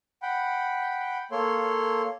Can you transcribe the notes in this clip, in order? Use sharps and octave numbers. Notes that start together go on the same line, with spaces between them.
F#5 G5 B5
A#3 A4 C#5 C6